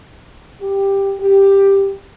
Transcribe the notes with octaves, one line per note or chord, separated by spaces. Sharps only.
G4
G4